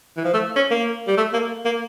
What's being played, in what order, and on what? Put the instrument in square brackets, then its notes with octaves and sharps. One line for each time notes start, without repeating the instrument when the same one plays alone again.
[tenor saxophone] E3
F3
A3
C#4
A#3
G3
A3
A#3
A#3